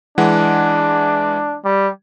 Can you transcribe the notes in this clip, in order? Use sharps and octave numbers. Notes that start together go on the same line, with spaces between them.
E3 G#3 D4 F#5
G3